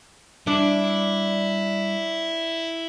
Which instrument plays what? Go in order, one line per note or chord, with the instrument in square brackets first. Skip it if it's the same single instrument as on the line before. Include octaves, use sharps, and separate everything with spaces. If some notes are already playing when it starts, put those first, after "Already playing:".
[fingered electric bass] G3 [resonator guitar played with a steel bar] D4 [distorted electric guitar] E4